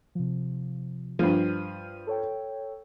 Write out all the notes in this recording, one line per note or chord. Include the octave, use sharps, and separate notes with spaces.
C3 F3
G2 F3 F6 D#7
A4 C#5 G5